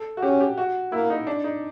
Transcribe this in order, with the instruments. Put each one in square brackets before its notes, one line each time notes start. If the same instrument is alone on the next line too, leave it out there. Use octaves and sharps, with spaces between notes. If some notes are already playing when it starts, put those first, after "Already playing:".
Already playing: [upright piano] A4
F#4
[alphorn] C#4 [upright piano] G4
[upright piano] G4
F#4
[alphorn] A#3 [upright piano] E4
[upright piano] D#4
D4
D#4